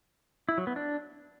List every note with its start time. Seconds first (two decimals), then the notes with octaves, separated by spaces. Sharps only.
0.49 E4
0.58 F#3
0.67 B3
0.76 D4